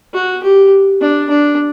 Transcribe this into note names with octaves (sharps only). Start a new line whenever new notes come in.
F#4
G4
D4
D4